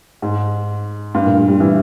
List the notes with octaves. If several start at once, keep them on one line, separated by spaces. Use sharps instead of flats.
G#2
G2
A#2
G3
G3
E3